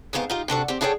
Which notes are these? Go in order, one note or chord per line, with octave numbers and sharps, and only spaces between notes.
D2 G#2 B3 C4 F5
D#4 F4 G4
C3 D4 F#4 A4
C4 G4
D4 E4 G#4 A4 C#5 G5